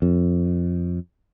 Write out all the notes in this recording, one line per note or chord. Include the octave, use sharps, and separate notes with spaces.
F2